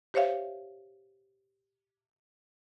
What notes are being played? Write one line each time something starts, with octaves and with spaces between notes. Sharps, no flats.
G4 C5 C#5 E5 F5